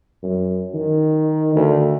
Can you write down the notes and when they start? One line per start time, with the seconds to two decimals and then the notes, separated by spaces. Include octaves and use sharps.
0.23 F#2
0.74 D#3
1.56 D2